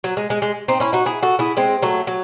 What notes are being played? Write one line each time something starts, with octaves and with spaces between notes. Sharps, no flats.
F#3
G#3
G#3
G#3
C4 D#4
C#4 E4
D#4 F#4
E4 G#4
F#4 A4
E4 G#4
G#3 C4
F#3 A3
F#3